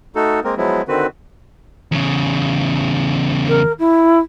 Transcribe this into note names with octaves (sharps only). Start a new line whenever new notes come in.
A3 D#4 F#4 A4
G#3 A#3 C4 A#4
F3 F#3 G#3 B3 E4
D3 D#3 C4 F#4 B4
E2 C#3
A#4
E4